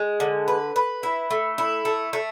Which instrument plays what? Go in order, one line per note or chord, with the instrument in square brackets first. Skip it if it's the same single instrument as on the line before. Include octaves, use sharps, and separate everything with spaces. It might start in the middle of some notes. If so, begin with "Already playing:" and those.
Already playing: [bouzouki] G#3
D3
B4
B4
E4
A3
E4
A3
A3